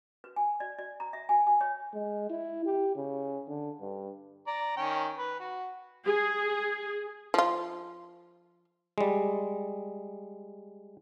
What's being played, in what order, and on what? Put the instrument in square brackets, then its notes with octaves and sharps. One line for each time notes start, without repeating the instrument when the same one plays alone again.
[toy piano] B4
G#5
D5
D5
A#5
E5
G#5
G#5
C#5
[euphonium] G#3
E4
G4
C#3
D3
G2
[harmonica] D5 A#5
D#3 C#4 G5
B4
F#4
[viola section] G#4
[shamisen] F3 F4
[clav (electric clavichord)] G3 G#3